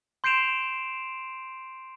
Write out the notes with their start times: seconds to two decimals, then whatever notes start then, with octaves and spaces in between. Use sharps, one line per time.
0.24 C6 G6 C7 D7 E7 F7